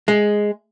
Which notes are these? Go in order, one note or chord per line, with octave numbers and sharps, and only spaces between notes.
G#3